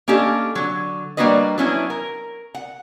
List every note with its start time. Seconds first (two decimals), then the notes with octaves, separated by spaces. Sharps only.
0.08 A#3 C#4 D4 G4 A4 D#5
0.55 D3 F#3
1.17 G3 A#3 D4 F#4 B4 D#5
1.58 F#3 B3 C#4 D4 E4
1.90 A#4
2.55 F#5